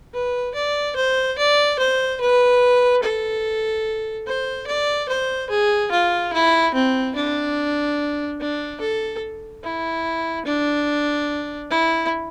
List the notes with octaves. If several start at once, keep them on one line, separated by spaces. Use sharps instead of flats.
B4
D5
C5
D5
C5
B4
A4
C5
D5
C5
G#4
F4
E4
C4
D4
D4
A4
E4
D4
E4